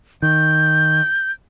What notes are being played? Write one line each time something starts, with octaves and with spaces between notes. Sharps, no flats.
D#3 G6